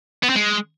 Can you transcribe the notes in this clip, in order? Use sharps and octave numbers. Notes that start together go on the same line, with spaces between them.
B3
C4
G#3